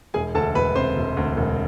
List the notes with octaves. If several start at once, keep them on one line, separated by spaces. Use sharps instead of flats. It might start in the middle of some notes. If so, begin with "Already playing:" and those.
E1 G#4 G#5
D2 A4 A5
E1 B4 B5
C3 C5 C6
E1
D2
E1